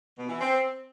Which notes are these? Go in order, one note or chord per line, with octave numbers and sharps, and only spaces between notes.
B2
E3
C4